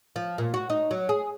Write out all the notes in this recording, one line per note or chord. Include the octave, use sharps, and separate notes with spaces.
F3
A#2
F#4
D#4
F#3
G#4